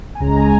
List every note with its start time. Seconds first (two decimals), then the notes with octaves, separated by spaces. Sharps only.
0.15 G#5
0.20 C#2 C#3 G#3 C#4 A#5
0.37 G#5